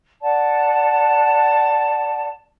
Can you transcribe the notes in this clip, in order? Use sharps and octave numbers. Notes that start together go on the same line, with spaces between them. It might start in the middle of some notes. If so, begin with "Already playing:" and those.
D5 F#5 A5